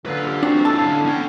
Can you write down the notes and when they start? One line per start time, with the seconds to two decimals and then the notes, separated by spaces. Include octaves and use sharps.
0.06 F#2 A#2 D3 F4 B4
0.27 G4
0.43 C4 D4 F#4
0.65 D4 E4 A4 A5
0.79 D3 C#4 F5
1.05 B3 C#4 G5